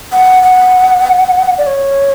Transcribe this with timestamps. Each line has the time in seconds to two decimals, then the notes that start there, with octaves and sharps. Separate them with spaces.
0.12 F#5
0.43 F#5
1.58 D5
1.67 C#5